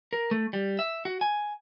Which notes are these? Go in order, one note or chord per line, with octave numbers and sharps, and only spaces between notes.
A#4
A3
G3
E5
F#4
G#5